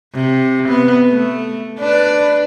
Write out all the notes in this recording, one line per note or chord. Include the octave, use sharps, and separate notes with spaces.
C3
B3
A3
D4 B4 D5